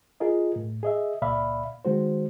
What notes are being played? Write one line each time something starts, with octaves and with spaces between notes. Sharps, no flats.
F4 G#4 A#4 D#5
A2
G#4 D#5 E5
C#2 A#2 D5 E5 F5 B5
D#3 G#3 F#4 C5